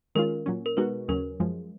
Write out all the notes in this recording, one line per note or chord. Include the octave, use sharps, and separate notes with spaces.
D#3 G#3 C#4 F4 A#4
A#2 F#3 C#4
A#4
B2 G#3 B3 D#4 F#4 B4
D#2 C#3 F#3 C#4 A#4
F#2 F3 G#3